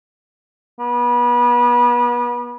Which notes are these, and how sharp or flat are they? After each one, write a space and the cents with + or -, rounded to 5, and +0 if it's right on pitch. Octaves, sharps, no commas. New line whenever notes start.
B3 -30